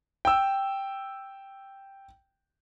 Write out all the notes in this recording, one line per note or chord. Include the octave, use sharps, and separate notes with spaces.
G5 E6